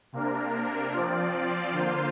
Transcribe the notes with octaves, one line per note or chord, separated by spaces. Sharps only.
C3 A#3 D4 A#4
F3 C4 F4 D5
D3 A#3 F4 C5